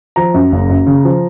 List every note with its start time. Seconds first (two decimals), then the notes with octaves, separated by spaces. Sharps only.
0.16 F3 A#5
0.34 F#2
0.52 F#1
0.70 F#2
0.87 C#3
1.05 F3